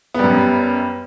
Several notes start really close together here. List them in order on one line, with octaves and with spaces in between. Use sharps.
B3 G3 F#2